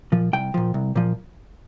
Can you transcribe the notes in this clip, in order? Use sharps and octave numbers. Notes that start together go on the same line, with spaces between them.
A#2 F3
C2 G5
A#2 F3
C2
A#2 F3